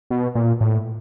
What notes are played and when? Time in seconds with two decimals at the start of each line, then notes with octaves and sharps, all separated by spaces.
0.10 B2
0.35 A#2
0.61 A2